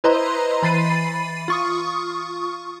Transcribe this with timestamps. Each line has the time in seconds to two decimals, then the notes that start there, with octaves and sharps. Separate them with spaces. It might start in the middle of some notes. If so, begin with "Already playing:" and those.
0.04 E4 B4 C5 D#5 A#5 C6
0.62 E3 B5 A6 C7 D#7
1.48 F4 C#6 D#6